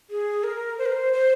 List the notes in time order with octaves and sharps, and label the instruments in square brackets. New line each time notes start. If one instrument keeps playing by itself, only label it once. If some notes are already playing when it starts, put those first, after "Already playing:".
[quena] G#4
A#4
C5
A#4
C5
C5